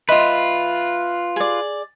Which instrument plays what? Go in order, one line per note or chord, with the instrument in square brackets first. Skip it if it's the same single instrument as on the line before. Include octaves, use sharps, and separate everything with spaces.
[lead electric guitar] F4 B4 [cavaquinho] D#5 E5 C6
[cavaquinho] G#4 D5